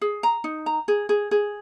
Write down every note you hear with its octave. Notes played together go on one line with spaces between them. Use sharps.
G#4
A#5
D#4
A#5
G#4
G#4
G#4